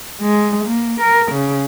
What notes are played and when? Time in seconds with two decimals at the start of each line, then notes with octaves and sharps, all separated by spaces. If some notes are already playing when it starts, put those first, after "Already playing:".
0.21 G#3
0.65 A#3
1.01 A#4
1.32 C#3